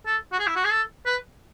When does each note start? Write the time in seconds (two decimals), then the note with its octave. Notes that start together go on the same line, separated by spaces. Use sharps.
0.06 A4
0.32 F#4
0.39 G#4
0.47 E4
0.56 F#4
0.64 G#4
0.72 A4
1.06 B4